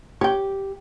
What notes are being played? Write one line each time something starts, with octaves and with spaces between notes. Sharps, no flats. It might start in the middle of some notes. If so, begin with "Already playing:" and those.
G4 C#5 G5